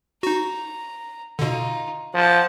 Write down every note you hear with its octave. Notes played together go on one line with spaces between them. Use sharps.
D#4 F#4 A#5
B2 D3 D#4 F4
F3 F#5 A5